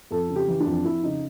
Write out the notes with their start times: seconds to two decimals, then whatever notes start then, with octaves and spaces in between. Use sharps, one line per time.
0.11 F2 A4
0.30 C#3
0.36 G4
0.48 E3
0.60 D4
0.66 F2
0.85 F2 E4
1.03 C#3 D#4